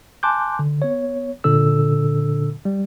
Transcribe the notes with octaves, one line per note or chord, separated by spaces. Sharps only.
G#5 A5 C6 D6 F#6 G6
D3
B3 C#5
A#2 D3 D4 A4 E6
G3